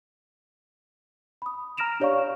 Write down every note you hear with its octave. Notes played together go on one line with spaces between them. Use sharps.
B5 D#6
A#5 F6 A#6 D7 E7 F7
D4 G4 C#5 D5 F5 C#6